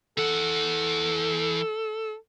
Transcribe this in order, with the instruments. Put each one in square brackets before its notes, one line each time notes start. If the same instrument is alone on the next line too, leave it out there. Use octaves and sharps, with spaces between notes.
[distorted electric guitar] E3 F#5 [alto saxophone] A4